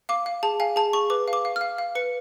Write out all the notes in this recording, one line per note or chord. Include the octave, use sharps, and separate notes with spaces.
F5 D6
F5
G#4 A5
F5 G#5
G#4 A5
G#4 C#6
B4 D6
F5
D6
F5
F6
F5
F5
B4 C#7